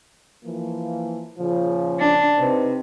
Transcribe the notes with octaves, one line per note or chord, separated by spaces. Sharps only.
E3 F3 A#3
A#2 C#3 F3
D4
C3 D#4 B4 C5